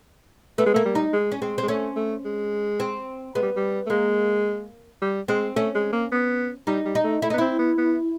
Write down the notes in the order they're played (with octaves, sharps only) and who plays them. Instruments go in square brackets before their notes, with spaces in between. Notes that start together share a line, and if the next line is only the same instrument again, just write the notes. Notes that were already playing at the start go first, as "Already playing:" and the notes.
[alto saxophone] A3 [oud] B3
[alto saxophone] G#3
[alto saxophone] A3 [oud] A#3
[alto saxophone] G3
[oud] D#4
[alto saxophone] G#3
[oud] C#4
[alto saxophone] G#3 [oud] C4
[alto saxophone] G#3 [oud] C4
[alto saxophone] A3 [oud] C#4
[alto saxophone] A3
G#3
[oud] C4
[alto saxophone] G#3 [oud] B3
[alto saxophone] G3
G3
A3
[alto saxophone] G#3 [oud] A#3
[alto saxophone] G3
[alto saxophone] G#3 [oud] C4
[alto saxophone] A3 [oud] C#4
[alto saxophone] G#3
A#3
B3
[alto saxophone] G3 [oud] D#4
[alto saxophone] G3
[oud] D#4
[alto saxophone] A3
[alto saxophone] A3 [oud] E4
[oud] D#4
[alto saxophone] B3
[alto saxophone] C4 [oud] E4
[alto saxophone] B3
B3